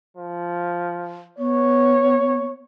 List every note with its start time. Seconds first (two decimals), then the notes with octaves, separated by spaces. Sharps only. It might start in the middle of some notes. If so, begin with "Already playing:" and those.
0.17 F3
1.38 B3 C#5